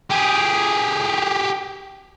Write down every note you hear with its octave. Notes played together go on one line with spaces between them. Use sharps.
G4 G#4